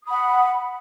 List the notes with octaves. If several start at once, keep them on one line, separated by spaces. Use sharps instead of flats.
F#5 B5 D#6